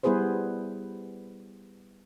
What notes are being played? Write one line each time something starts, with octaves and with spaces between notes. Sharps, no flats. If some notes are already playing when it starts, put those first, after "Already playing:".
G3 B3 E4 G#4 B4 C5